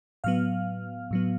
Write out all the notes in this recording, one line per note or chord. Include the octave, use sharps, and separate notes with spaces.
A2 F#3 B3 F5 F6
A2 F#3 B3